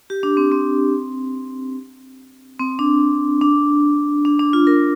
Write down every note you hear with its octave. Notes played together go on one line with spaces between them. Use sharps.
G4
D4
C4
C4
C4
D4
D4
D4
D4
F4
A#4